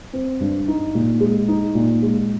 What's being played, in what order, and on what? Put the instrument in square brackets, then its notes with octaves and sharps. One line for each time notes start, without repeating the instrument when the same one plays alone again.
[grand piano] C4
G2
D#4
A#2
G#3
D#4
A#2
G#3